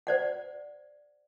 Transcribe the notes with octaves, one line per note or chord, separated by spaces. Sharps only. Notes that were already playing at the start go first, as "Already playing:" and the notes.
C5 D5 F#5